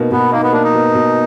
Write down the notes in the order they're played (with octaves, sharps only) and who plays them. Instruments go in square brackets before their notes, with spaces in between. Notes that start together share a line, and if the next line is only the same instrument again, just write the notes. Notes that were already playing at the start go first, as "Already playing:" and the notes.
Already playing: [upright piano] B2 A#3 D#4
[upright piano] B2 [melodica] B3
[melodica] A#3 [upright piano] D#4
[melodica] B3
[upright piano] A#3 [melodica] D4
[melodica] D#4
[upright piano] B2
B2